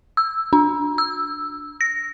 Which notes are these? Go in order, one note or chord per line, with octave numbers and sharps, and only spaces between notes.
E6
D4
E6
A#6